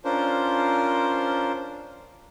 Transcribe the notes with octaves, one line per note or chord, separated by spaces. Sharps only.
C#4 D4 F4 A#4 C5